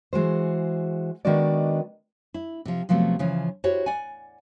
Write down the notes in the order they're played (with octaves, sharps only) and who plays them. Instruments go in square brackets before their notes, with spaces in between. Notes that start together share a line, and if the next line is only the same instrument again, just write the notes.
[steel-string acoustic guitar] E3 G#3 F#4 C5
D#3 G#3 B3 D4 F#4 D5
[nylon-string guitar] E4
C3 F3
C3 F3 F#3 A3 B3 C4
C#3 E3 F3 C#4
E4 F#4 G4 C5 C#5
D5 F#5 G#5